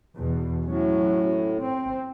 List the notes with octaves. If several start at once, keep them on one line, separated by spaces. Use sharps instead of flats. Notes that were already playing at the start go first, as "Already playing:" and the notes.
E2 B2
A2 F#3 C#4
C4